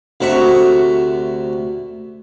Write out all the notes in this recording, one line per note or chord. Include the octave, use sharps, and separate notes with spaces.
D2 C3 F#4 E5 C#6